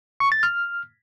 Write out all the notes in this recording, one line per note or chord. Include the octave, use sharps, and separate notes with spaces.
C#6
A6
F6